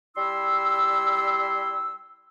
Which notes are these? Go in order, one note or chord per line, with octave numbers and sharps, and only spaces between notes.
G3 E4 C6 E6